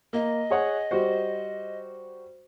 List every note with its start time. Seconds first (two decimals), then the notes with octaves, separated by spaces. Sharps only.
0.13 A#3 D#5
0.50 G#4 C#5 F#5
0.91 G3 F#4 C5